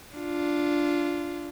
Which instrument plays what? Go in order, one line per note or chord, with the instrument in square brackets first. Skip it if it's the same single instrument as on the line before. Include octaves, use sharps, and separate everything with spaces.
[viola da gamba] D4 F4